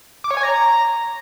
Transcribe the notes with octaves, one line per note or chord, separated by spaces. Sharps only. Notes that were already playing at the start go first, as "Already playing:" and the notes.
D6
C#5
G#5
A#5